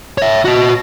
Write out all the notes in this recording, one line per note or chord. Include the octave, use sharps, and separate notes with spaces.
C#5 E5
F#4 D#5